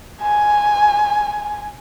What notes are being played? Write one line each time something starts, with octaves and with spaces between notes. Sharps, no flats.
G#5